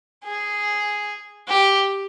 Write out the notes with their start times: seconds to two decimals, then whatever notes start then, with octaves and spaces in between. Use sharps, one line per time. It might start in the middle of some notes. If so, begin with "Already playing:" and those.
0.24 G#4
1.48 G4